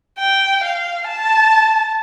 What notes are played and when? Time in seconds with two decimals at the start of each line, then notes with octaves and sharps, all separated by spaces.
0.19 G5
0.63 F5
1.07 A5